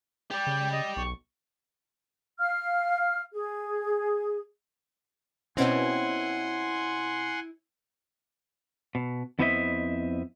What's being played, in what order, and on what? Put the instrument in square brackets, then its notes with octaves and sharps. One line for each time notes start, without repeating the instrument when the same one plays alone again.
[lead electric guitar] G4 D5 [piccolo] G5
[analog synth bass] C#3
[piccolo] D#5
[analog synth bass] B1 [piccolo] C#6
[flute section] F5 F6
G#4
[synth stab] B2 C4 [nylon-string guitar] C#4 [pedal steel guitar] E4 [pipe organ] F#5 G#5 C6
[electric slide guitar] B2
F2 B3 E4 C5 D#5 E5